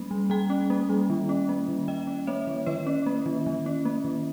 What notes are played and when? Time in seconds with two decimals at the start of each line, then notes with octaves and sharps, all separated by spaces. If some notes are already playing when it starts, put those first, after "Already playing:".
Already playing: G3 A#3 C#4 B5
0.11 G3
0.30 G3 G5 A#5
0.50 C#4
0.70 A#3
0.89 G3
1.10 D#3
1.29 C#4
1.49 A#3
1.68 D#3
1.88 D#3 D#5 G5
2.07 C#4
2.27 A#3 C#5 E5
2.47 D#3
2.66 D#3 B4 D#5
2.87 C#4
3.06 A#3
3.26 D#3
3.46 D#3
3.66 C#4
3.85 A#3
4.05 D#3